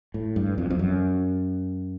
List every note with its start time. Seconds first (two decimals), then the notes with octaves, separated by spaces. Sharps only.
0.14 A2
0.36 G2
0.58 F2
0.70 F2
0.79 F#2